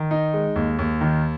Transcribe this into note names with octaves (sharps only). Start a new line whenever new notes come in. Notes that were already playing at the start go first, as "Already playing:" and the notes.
Already playing: D#3
D#4
G#3
D#2
D#2
D#3